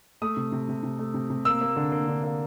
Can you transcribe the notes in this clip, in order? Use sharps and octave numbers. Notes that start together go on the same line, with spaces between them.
A3 D#6
C3
C3
C3
C3
A3
C3
C3
A#3 E6
A#3
D3
A#3
D3
A#3